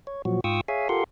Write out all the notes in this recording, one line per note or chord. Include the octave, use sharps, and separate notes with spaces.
C#5
A#2 F3 F#3 F#4
G#2 F4 G5 C#6 D#6 E6
G#4 C#5 E5 F5 G#5
F4 G4 A4 A#4 F#5 C6